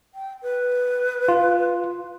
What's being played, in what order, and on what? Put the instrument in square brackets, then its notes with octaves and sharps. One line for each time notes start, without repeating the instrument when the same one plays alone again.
[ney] G5
B4
[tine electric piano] F4